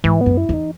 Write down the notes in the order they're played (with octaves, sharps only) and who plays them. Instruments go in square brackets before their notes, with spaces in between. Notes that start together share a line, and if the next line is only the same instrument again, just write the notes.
[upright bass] G#2 [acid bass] E3
[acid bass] B3
[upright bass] F#2
[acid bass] E4
[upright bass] E2 [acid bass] D#4